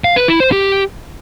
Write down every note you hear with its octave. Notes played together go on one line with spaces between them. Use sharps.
F5
B4
E4
C5
G4